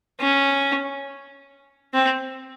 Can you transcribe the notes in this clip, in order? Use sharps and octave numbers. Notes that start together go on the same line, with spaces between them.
C#4
C4